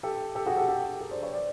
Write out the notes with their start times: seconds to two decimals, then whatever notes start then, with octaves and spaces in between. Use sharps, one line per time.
0.03 G4 A4
0.35 G4 A4
0.46 F#4 G#4
0.57 G4 A4
0.68 G4 A4
1.00 G#4 A#4
1.11 C5 D5
1.22 B4 C#5
1.33 C5 D5